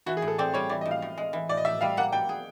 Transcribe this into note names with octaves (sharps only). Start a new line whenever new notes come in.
E3 F#4
G#4
A2
A4
C4 D5
G3 C#5
E3 D5
D#5
A2
F5
A2
G#3
E3
A2 D5
D#5
A2 E5
G3 F5
A#3 F#5
G3 G5
G#4